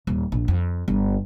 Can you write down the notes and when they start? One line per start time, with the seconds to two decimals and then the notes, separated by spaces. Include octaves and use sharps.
0.07 D#1
0.32 A#1
0.48 F2
0.88 G1